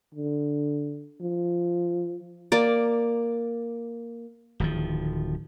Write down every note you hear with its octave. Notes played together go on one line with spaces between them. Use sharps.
D3
F3
A#3 D5
D1 D#3 F3